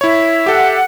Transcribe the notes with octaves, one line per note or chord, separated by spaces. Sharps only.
E4 C#5 E5
G4 A4 F#5